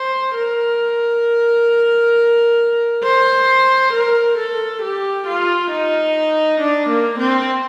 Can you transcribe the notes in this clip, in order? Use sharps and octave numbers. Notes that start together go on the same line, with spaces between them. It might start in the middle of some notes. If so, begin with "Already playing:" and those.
Already playing: C5
A#4
C5
A#4
A4
G4
F4
D#4
D4
A#3
C4